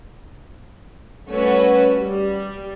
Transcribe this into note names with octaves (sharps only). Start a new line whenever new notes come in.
G3 A3 C#4 F#4 B4
G3